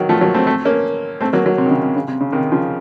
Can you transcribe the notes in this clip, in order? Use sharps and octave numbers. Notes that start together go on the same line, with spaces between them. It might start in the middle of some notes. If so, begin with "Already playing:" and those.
Already playing: D#3 F#3
F3 A3
F#3 A#3
A3 C4
A3 C4
A#3 C#4
A3 C4
F#3 A#3
F#3 A#3
C3
D#3
C#3
C3
C#3
C3
C#3
C3 D#3
C#3 F3